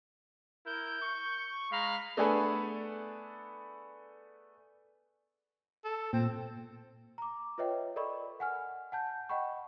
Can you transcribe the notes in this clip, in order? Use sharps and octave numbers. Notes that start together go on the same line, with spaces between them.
E4 A#4 G6
C#6
G#3 F5 A#5 B5
A3 B3 D4 G#4 A4 B4
A4
A#2 C4
A#5 D6
F4 B4 C#5 D#5 E5 G5
A4 A#4 D5 D#5 B5 C#6
F#5 G#5 F6
F#5 A5 G6
D#5 F#5 G5 B5 C#6